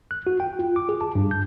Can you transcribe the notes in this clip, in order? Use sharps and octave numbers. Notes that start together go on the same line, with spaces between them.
F#6
F#4
G5
F4
D6
G#4
A5
G2
G6